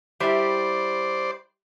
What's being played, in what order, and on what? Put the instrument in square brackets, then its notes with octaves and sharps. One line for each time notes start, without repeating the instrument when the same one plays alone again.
[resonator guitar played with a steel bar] G3 E4 G4 [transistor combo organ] C5 D5